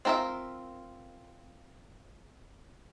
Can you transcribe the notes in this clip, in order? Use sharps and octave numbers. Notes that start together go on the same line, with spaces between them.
C4 F4 A#4 B4 E5